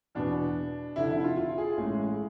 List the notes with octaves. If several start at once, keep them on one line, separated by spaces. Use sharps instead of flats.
E2 B2 B3 D4
F1 F2 D3 E4
E4
F4
F4
G#4
A1 A2 G#3 G#4